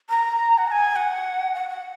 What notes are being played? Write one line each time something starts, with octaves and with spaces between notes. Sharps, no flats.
A#5
F#5
A#5
G#5
F#5
F#5
F#5